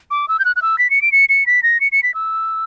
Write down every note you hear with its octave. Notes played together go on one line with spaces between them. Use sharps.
D6
E6
G6
F#6
F#6
E6
B6
C#7
D7
C#7
C#7
B6
A#6
C#7
C#7
B6
E6